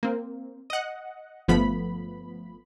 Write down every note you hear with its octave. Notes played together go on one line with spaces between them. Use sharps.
A#3 C4
D#5 F#5
G1 F3 A3 B3 B5